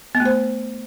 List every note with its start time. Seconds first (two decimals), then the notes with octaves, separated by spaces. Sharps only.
0.15 B3
0.20 A3
0.25 C5